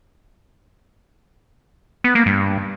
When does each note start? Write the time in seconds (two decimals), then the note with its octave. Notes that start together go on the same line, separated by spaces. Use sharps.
2.04 B3
2.15 A#3
2.26 G2